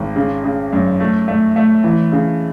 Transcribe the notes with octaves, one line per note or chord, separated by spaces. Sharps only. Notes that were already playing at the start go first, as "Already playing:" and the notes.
Already playing: G#1
C#3
C#3
F#2
A3
A3
A3
E3
C#3